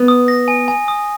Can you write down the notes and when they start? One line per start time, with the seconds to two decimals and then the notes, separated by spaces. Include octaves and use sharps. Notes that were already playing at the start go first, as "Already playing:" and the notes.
Already playing: B3
0.08 D#6
0.28 A#6
0.48 G#5
0.68 G#5
0.88 D#6